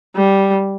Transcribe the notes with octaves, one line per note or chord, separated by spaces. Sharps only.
G3